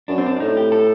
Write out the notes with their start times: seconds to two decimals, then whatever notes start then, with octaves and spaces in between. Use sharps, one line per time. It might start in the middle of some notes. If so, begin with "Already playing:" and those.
0.08 F#2 D4
0.18 C4
0.26 D4
0.36 D4
0.40 A2 D#4
0.57 G4
0.72 A4